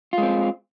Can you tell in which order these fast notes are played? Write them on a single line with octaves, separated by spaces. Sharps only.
F4 G#3 C4